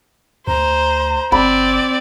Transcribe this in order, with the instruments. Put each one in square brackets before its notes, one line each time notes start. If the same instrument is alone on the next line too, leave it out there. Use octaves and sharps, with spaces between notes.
[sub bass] D2 [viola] C5 [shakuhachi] A#5
[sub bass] F#1 [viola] C4 D5 [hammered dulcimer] B5